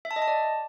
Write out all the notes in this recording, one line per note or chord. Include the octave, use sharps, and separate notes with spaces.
E5
A5
D#5
A5
D5